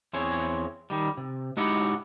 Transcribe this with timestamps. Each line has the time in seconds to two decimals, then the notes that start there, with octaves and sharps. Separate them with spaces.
0.13 E2 C4 E4 G#4 C#5
0.90 D#3 G3
1.17 C3
1.57 G#3 D#4 E4 F#4 G4 F#5